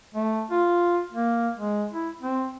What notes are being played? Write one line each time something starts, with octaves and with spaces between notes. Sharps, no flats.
A3
F4
A#3
G#3
E4
C4